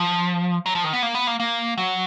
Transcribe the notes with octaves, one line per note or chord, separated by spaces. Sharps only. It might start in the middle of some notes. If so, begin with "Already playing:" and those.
Already playing: F3
F#3
F3
D#3
B3
A#3
B3
A#3
A#3
F#3